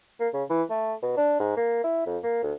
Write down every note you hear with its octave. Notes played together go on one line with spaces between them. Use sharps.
A#3
C#3
E3
A3
B2
D4
G#2
A#3
E4
F2
A#3
D2